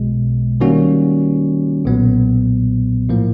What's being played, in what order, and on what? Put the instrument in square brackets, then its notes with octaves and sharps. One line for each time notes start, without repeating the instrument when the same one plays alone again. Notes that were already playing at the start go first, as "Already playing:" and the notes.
Already playing: [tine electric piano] B1 B2 G#3
D#3 G3 A#3 C#4 F#4
B1 A#2 F#3 B3
A2 F3 A#3